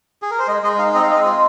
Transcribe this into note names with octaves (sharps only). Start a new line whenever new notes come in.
G#4
A#4
C5
G#3 D#5
G#3 D#5
D#4 F5
C4 D#5
F5
G#3 D#5
F4